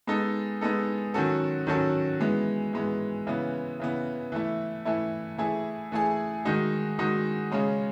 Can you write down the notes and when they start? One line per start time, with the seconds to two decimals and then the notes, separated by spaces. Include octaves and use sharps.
0.07 G#3 B3 D#4 A4
0.61 G#3 B3 D#4 A4
1.14 D#3 F#3 C#4 F#4 A4
1.67 D#3 F#3 C#4 F#4 A4
2.20 E3 G#3 B3
2.73 E3 G#3 B3
3.27 C#3 E3 B3
3.80 C#3 E3 B3
4.32 E3 A3 E4
4.85 E3 A3 E4
5.38 E3 A3 E4 G#4
5.92 E3 A3 E4 G#4
6.45 D#3 G#3 D#4 F#4
6.98 D#3 G#3 D#4 F#4
7.52 C#3 G#3 C#4